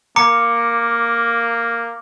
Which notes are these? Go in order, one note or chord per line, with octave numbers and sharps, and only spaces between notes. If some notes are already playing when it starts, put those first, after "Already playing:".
A#3 A#5 D6 C#7